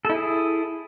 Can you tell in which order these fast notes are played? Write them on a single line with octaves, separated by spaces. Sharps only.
A4 E4 G#4